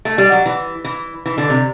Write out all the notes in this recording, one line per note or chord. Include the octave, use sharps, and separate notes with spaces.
A3
G3
F#3
E3
E3
E3
D3
C3